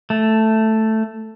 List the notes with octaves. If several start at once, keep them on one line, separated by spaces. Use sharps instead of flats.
A3